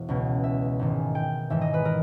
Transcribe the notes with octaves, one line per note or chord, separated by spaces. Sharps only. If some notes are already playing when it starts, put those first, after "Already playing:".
Already playing: E1
C#2 B2
E5
G#1 G#2 D#3
G5
G#1 G#2 E3 E5
D#5
B4
A#4